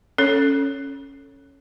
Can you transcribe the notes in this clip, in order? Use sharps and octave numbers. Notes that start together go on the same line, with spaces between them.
C#4 A4 C#5